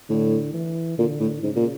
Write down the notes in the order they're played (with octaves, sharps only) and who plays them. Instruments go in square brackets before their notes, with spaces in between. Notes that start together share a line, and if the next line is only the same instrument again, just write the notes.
[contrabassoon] A2 [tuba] D3
[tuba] E3
[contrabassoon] A#2 [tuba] D3
[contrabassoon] A2
[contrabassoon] G#2 [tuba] C#3
[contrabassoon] A#2